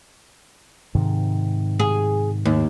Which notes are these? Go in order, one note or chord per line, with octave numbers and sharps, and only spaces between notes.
G#2 C3 D#3
G#4
D#2